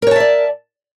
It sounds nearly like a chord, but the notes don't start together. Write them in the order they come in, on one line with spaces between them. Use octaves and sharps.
A#4 C#5 A5 E5 D5